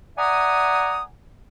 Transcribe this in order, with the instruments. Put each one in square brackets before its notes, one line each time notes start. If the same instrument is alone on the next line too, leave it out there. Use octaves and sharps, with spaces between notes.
[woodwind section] D5 E5 F#5 G#5 A#5 D#6